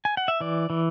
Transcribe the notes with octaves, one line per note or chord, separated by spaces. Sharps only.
G#5
F#5
E5
E3 D5
E3